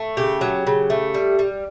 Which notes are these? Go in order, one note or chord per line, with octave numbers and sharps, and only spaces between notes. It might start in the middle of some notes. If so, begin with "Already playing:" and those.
Already playing: A3
C#3 G4
F#3
C#3
A3
G3
G3